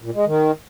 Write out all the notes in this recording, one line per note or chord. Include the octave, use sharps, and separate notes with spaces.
A#2
G#3
D#3